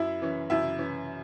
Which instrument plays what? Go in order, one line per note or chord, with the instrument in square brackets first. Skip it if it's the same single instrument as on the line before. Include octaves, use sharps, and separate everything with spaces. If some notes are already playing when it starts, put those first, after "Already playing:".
Already playing: [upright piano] F#2 E4 E5
E3 C#4
F#2 E4 E5
E3 C#4